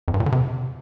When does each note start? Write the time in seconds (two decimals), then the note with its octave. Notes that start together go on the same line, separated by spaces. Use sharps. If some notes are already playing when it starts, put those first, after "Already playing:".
0.08 F2
0.14 G2
0.20 A#2
0.26 D3
0.32 C3